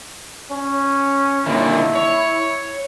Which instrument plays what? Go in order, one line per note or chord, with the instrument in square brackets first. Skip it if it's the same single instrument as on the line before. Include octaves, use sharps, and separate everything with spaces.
[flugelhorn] C#4
[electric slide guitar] A#2 D3 D#3 [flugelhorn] E4
[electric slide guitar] C#5